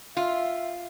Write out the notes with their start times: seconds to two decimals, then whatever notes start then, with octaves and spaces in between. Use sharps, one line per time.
0.17 F4 E5